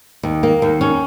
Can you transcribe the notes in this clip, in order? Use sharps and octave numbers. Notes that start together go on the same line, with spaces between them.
D#2
A#3
D#2
C#4